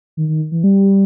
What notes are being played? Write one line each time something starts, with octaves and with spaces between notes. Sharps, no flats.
D#3
D#3
E3
G3